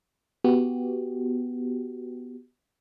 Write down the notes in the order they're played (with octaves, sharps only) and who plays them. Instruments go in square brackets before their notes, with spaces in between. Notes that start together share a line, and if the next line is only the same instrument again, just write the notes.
[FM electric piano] B3 F#4 G4